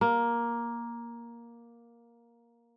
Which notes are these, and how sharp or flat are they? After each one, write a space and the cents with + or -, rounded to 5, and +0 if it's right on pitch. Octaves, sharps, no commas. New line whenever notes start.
A#3 +10